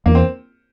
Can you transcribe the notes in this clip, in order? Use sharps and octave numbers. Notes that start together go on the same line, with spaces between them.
E2 A#3
C4